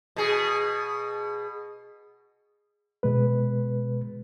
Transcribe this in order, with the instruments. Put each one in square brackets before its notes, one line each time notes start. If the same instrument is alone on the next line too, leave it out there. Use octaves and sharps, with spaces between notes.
[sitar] B2 G#4
[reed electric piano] B2 G#3 B4